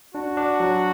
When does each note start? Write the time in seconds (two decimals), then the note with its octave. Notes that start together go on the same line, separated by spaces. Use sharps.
0.15 D4 F#4
0.37 D4
0.60 F#3